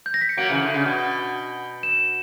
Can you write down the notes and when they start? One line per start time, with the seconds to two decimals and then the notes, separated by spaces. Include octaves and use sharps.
0.06 G6
0.14 A#6
0.21 B6
0.29 C#7
0.37 F#3 A#3 D7
0.49 C#3 E3
0.61 D3
0.74 C#3
0.86 B2
1.83 E7